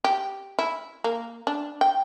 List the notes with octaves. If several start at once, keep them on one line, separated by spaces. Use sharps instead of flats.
G4
E4
A#3
D4
G5